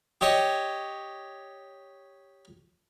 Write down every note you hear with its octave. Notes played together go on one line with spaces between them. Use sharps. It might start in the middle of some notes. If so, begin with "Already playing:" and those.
G4 C#5 D#5